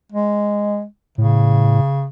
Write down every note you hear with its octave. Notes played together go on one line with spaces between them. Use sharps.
G#3
A2 C#3